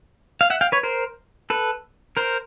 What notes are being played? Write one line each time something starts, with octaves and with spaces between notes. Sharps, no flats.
F5
E5 F#5
F5 G5
B4 C#5
A#4 C5
A4 B4
A#4 C5